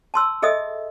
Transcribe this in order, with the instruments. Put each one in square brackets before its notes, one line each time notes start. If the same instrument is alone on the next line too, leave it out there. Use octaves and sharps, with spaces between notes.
[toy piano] A5 C6 E6
G#4 A4 D#5 E5 D#6